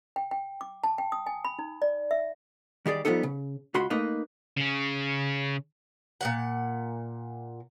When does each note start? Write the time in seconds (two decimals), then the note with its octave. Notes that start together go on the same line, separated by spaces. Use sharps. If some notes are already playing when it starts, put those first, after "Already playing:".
0.16 G5
0.31 G5
0.61 D6
0.84 A5
0.98 G5
1.12 D#6
1.26 G#5
1.45 B5
1.59 D#4
1.82 D5
2.11 E5
2.86 D#3 G3 G#4 D5
3.05 F3 G3 G#3 B3 D#4 A4
3.23 C#3
3.74 C#2 F#4 B5 C6
3.90 A3 A#3 D#4 B4 D#5
4.57 C#3 C#4
6.21 A#2 F#3 F#5